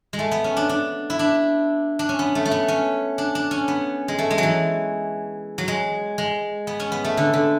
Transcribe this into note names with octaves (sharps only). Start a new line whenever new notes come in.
G#3
A3
B3
C#4
D4
D4
E4
D4
D4
C#4
B3
A3
A3
B3
C#4
D4
D4
C#4
B3
G#3
A3
G#3
F#3
E3
F#3
G#3
G#3
B3
C#4
B3
A3
D3
D3